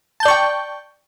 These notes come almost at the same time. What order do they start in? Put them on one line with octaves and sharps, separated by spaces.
A5 G6 D5 C#6 G5